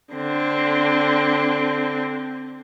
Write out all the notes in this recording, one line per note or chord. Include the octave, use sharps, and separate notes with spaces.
D3 C4